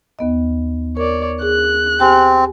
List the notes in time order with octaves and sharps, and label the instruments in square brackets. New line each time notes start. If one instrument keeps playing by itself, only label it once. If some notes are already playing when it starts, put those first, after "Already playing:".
[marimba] D#2 B3 D#5
[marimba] A#4 [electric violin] C#5 D5
[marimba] G#4 [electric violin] F#6
[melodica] C4 [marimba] G4 G#5